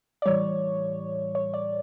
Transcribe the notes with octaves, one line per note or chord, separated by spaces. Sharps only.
D5
A2 E3 G3 C#5
C#5
D5